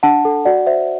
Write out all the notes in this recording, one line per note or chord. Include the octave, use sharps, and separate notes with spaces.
D4 F#5 A5
A4
F#4 D5 F#5
C5 E5